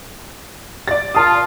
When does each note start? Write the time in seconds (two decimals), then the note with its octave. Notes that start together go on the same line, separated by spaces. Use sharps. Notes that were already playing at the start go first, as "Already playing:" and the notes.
0.88 D5 A6
1.15 A#2 F4 A5 D#6